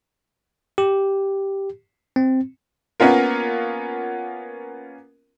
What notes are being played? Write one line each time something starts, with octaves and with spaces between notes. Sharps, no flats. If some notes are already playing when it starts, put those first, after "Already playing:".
G4
C4
A#3 B3 C#4 F4 A#4